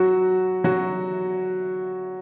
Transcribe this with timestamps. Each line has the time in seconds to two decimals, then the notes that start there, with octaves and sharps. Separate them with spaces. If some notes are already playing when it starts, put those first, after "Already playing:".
Already playing: F#3 F#4
0.64 F#3 F#4